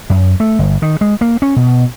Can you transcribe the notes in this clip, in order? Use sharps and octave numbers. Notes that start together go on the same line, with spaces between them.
F#2
A3
G1
D#3
G#3
A#3
C#4
B2